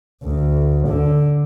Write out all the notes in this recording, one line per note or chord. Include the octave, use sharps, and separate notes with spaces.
D2
D3